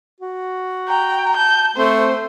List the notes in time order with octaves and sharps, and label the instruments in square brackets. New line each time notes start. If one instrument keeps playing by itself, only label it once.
[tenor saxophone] F#4
[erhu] G5 [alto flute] A#5
[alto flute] A5 [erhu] G6
[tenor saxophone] A3 [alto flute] C4 [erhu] C5